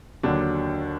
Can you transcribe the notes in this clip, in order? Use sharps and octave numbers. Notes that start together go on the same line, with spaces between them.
D#2 D3 F#3 D4